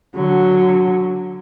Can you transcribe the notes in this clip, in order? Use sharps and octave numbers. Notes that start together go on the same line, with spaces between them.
D3 F#3